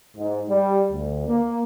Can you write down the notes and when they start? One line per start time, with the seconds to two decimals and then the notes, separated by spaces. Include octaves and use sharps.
0.16 G#2
0.49 G3
0.91 D2
1.27 A#3